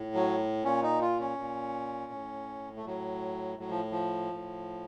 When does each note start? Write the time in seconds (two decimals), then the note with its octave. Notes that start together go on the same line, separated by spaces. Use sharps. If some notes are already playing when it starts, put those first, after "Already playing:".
Already playing: A2
0.14 F#3
0.64 A#2 C#4
0.83 D#4
1.01 F4
1.20 C#4
1.38 A#2
2.12 A2
2.77 A3
2.86 A2 F#3
3.59 A2 F#3
3.70 F3
3.92 F3
4.33 A2